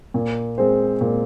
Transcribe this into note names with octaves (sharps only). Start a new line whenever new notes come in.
A#2
G#3 C4 G#4 C5
A#2